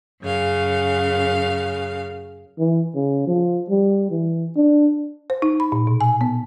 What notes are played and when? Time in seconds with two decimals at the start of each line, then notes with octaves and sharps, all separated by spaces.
0.22 F#2 C#3 F5
2.59 E3
2.95 C#3
3.27 F3
3.70 G3
4.11 E3
4.56 D4
5.30 C5
5.42 D#4
5.60 B5
5.72 A#2
5.87 B2
6.01 G#5
6.21 B3